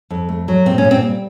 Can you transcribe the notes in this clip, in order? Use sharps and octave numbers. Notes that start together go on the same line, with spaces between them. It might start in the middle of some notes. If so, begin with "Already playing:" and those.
F2
A3
F#3
A#2 C4
C#4
A#2
C4
G3